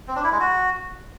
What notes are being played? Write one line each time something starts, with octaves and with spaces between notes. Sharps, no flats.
C4
D4
E4
G#3
F#4